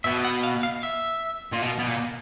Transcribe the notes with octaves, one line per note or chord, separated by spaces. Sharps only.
B2 E5
F#5
F5
F5
E5
A#2
B2
B2
A#2